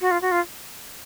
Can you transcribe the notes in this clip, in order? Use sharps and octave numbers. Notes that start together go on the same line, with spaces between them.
F#4
F4
F#4
F4